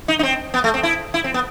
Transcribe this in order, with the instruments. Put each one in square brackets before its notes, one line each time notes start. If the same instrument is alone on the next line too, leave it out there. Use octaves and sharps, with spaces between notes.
[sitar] D#4
D#4
C4
B3
A3
C4
E4
E4
C4
B3